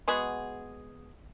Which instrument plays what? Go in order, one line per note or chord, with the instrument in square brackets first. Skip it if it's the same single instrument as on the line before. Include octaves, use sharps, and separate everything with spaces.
[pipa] G#3 B3 F#4 G#4